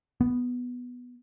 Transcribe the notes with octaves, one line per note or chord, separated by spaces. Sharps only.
B3